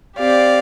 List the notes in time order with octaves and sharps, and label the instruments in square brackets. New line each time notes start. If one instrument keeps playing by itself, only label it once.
[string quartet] C4 G4 D5 F5